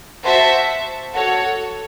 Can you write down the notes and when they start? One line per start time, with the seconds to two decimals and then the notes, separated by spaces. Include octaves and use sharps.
0.23 F#4 C5 E5 A5
1.13 F#4 A4 C#5